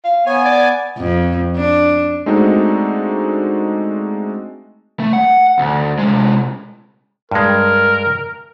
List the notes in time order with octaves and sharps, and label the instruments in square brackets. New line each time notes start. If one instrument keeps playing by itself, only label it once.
[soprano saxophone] F5
[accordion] B3 G#5 [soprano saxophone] C#5
[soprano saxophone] D5
[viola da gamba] F2
D4
[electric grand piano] G#3 A3 C4 D4 D#4 F#4
[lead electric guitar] A3
F#5
D2
C3 G#3
[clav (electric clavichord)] G2 G#3 [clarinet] A#4